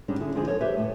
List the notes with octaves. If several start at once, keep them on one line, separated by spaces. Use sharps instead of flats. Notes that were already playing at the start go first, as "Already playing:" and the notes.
G#2 G3 G#3 C#4 D4
D3 E4 G#4
D3 F3 G#3 D4 G#4
A4 A#4 C#5
G4 B4 C5 E5
A2 A3